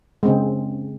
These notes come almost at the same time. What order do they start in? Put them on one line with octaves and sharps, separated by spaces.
G#3 C4 C#3